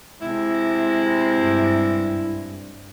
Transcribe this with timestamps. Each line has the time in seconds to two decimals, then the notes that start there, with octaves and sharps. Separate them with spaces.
0.21 C3 G#3 E4
1.34 G2